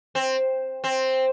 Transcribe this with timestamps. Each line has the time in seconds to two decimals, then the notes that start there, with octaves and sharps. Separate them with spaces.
0.15 C4
0.84 C4